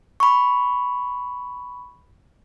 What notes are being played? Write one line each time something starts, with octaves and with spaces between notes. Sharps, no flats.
B5 C#6